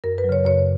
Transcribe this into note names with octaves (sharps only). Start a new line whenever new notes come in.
F#2 A#4
B4
F#3
C#3 C#5
F#2 C#5